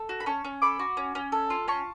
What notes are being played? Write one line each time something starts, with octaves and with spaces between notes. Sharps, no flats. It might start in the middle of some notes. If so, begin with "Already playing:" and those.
Already playing: A4
F#4
B5
C#4 A5 C#6
C#4
A4 B5 D6
F#4
C#4
C#4
A4
F4
C#4 A5 C#6